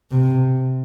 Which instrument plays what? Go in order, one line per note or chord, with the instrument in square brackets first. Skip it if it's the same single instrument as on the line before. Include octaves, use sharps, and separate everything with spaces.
[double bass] C3